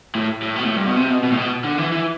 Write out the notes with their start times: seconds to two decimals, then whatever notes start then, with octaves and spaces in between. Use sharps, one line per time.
0.15 A2
0.43 A2
0.56 B2
0.66 A2
0.76 G2
0.86 B2
0.96 C3
1.10 B2
1.23 B2
1.31 A2
1.37 B2
1.64 D3
1.78 E3
1.92 E3